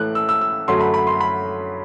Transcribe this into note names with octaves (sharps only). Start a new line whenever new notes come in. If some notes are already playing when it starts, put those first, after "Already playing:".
Already playing: A2 E3 A3 F#6
E6
E6
E6
F#2 D3 F#3 A3 C6
B5
B5
C6
B5